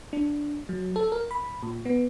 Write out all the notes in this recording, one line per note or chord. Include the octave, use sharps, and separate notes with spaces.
D4
F#3
A4
A#4
B5
A#2
B3